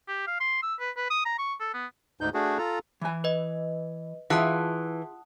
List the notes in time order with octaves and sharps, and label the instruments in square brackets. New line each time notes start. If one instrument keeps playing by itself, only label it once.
[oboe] G4
F5
C6
E6
B4
B4
D#6
A#5
C#6
A4
B3
[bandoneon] D2 G#2 D#4 G6
A3 D4 F#4 G#4
F4 A4 A#5
[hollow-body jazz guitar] E3 G#5
[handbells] B4 D#5
[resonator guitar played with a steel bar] E3 [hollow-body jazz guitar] F4 G#4 F5 [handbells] F#5 A5 D#6